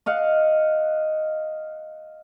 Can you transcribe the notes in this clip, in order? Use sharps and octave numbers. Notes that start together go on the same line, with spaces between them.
D#5 F5 F#5